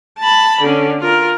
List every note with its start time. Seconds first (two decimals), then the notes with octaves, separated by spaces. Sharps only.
0.19 A5 B5
0.61 D3 C#4
1.00 F4 A#4